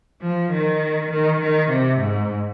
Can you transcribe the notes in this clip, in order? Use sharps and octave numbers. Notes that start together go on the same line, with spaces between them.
F3
D#3
D#3
D#3
C3
G#2